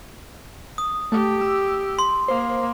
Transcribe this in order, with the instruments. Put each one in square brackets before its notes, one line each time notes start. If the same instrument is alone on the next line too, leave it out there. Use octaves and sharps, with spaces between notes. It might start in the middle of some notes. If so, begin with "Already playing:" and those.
[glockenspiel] D#6
[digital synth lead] A3 [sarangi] G4
[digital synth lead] E6
[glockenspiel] C6
[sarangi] A#3 [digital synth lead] C5